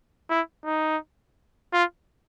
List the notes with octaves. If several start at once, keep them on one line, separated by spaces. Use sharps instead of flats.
E4
D#4
F4